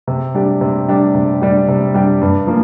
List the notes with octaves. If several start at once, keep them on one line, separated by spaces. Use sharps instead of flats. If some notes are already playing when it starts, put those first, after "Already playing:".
C3
G3 D4 G4
C3
G3 D4 G4
C3
G3 D4 G4
C3
G3 D4 G4
G2
F3 A#3